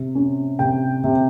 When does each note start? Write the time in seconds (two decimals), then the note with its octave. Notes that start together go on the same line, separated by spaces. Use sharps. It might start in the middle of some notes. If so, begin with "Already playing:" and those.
Already playing: C3
0.15 C#4
0.59 C3 G5
1.04 C3